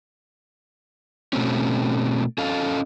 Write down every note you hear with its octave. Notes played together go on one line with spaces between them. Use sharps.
B2 A3 C4 C#4
C#4 A4 D#5 F5